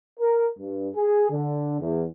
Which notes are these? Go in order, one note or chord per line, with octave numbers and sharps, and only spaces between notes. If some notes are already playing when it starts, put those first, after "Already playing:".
A#4
G2
G#4
D3
E2